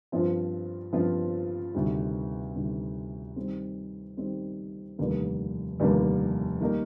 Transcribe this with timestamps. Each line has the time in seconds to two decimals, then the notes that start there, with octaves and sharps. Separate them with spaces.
0.12 G2 F3 C4 F4
0.93 G2 F3 C4 F4
1.75 D2 C3 D#3 G3
2.55 D2 C3 D#3 G3
3.36 D#3 G3 C4
4.17 D#3 G3 C4
4.98 F1 D#2 D3 G3 A#3
5.80 F1 D#2 D3 G3 A#3
6.60 D#3 G3 A#3 D#4 A#4